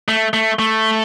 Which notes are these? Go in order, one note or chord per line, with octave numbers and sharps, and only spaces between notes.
A3
A3
A3